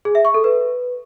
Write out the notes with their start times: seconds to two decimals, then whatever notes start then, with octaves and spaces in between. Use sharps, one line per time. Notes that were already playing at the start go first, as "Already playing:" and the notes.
0.05 G#4
0.15 E5
0.25 C#6
0.34 A4
0.44 B4